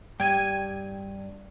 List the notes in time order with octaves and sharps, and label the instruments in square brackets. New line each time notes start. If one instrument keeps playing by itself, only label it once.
[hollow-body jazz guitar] G2 [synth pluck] G5 G#6 D#7